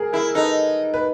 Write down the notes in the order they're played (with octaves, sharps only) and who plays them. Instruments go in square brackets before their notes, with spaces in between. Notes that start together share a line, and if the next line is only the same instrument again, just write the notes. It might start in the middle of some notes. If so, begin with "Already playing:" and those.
Already playing: [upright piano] G#4 A#4
[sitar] E4 [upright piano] G#4 A#4
[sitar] D#4 [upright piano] A4 B4
[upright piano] B4